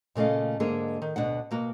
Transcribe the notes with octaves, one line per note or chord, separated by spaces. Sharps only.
A#2 C#3 A3 D#5 F5
G#2 D3 G#3 A#3 G#4
D#3
D2 B2 D4 F#5
B2 A#3 F#4